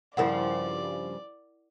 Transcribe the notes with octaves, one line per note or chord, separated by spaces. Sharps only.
G2 C#3 F3 E4 A#4 D5 F#5